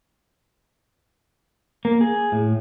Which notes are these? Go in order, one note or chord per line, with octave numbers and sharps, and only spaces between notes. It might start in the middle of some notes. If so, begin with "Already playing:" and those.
A#3
G#4
A2